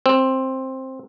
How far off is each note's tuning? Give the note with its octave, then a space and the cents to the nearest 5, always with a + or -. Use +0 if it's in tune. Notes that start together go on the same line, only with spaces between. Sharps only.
C4 +10